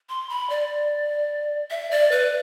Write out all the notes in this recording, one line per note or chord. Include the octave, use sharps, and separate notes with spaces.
C6
B5
D5
E5
D5
B4